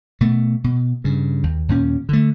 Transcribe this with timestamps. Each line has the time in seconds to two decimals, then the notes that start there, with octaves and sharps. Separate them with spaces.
0.21 B2 A3
0.64 B2
1.04 G2 C#3
1.43 D#2
1.69 D#2 A#2 C#4
2.09 D3 A3